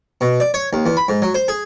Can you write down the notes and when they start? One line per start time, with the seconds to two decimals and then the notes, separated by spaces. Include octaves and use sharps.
0.21 B2
0.40 D5
0.54 C#5
0.73 D#2
0.86 E2
0.97 B5
1.09 G#2
1.22 F#3
1.35 C5
1.48 G#4